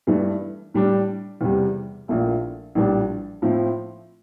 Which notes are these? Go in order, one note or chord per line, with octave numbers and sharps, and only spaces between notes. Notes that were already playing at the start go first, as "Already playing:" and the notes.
G2 E3 A3
A2 G3 D4
E2 C3 G3
A#1 A#2 A3 E4
A#1 A2 E3 G3 D4
A2 F3 C4 E4